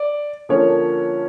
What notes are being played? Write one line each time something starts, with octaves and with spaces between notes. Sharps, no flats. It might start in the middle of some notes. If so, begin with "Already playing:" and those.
Already playing: D5
D3 F3 A#3 C#4 C#5